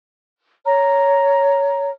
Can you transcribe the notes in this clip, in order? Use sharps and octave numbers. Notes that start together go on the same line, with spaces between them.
C#5 A#5